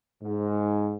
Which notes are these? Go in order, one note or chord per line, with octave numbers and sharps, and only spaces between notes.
G#2